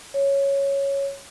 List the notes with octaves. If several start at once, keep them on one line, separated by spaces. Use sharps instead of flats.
C#5